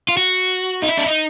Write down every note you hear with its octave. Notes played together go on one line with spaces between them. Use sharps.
F4
F#4
D#4
E4
D4
D#4